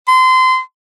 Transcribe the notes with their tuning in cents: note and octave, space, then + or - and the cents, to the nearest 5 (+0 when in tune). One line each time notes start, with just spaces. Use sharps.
C6 -25